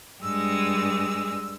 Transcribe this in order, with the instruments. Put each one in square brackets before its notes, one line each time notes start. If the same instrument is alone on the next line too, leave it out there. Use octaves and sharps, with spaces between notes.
[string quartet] G2 G#3 [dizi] E6